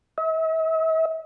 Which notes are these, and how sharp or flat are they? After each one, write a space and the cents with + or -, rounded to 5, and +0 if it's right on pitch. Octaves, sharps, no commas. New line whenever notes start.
E5 -45